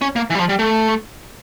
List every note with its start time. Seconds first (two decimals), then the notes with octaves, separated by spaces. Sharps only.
0.01 C#4
0.16 A#3
0.30 E3
0.35 G3
0.39 F3
0.49 G3
0.59 A3